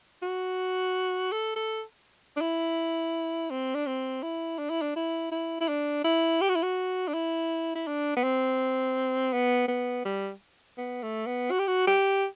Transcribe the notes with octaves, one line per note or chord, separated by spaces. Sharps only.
F#4
A4
A4
D4
E4
C4
D4
C4
E4
D4
E4
D4
E4
E4
E4
D4
E4
G4
F#4
E4
F#4
D4
E4
E4
D4
B3
C4
B3
B3
G3
B3
A3
B3
F#4
G4
F#4
G4